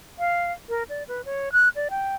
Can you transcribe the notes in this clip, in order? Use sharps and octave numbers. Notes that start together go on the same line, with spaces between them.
F5
A#4
D5
B4
C#5
F#6
D5
G5